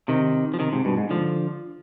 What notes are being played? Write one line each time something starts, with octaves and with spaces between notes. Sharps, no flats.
C3 D#3
F3
C3 D#3
G#2 C3
G2 B2
G#2
D3 F3